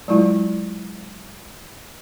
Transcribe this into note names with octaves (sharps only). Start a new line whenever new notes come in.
F#3 G#3 E4 F4